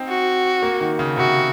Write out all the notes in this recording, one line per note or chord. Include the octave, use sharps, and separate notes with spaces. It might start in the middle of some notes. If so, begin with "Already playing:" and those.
Already playing: C4 D#4
F#4
A#3
D#3
C#3
C3 F#4